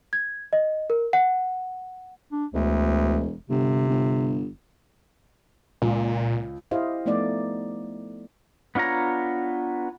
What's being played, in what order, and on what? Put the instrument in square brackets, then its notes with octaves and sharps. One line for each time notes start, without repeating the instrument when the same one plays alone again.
[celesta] G#6
D#5
A#4
F#5
[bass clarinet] D4
[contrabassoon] E1 [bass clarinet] D2
[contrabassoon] G1 [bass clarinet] C3
[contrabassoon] G1
[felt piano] C#2 [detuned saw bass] A#2
[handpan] E4 G4 C5 D#5 F5
F3 A3 B3 D#4 D5
[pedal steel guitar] B3 D4 F4 C#5 A#5